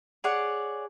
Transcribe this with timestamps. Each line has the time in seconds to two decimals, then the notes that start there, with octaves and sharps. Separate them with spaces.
0.24 G#4 C#5 D5 F#5